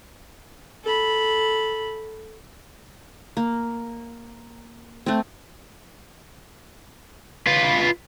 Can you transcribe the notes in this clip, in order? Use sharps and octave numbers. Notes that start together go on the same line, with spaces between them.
A4 B5
A#3
A3 C4
F4 B4